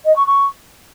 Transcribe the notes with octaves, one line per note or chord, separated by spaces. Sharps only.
D#5
C#6
C#6